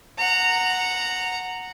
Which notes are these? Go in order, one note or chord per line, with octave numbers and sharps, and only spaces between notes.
F#5 A#5